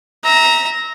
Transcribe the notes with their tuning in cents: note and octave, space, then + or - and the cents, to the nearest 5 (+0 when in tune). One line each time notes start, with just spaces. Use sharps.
E5 -30 A#5 +0